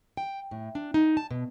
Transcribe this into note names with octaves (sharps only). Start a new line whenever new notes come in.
G5
A2
D4
D#4
A5
B2